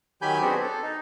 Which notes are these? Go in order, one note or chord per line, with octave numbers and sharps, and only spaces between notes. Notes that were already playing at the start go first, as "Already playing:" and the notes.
D#3 F#3 G4 G#5 B5 G6
B3 C4 D4 F#4 G#4
A4
D#4